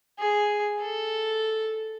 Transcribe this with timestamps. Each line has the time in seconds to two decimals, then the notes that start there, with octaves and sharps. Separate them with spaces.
0.19 G#4
0.81 A4